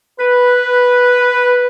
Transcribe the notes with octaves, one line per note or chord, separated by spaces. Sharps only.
B4